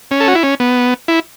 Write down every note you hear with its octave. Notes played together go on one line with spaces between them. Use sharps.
C#4
A4
F#4
E4
C#4
B3
E4